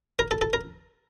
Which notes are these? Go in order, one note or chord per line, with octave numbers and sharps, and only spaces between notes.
A#4
A4
A4
A#4